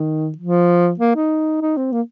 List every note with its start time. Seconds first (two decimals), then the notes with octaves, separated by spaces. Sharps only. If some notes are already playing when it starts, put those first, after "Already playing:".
Already playing: D#3
0.37 F3
0.99 A#3
1.15 D#4
1.61 D#4
1.77 C4
1.92 A#3